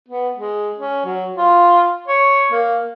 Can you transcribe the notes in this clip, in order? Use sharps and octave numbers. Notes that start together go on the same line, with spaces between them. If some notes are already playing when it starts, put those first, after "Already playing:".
B3
G#3
C#4
F#3
F4
C#5
A#3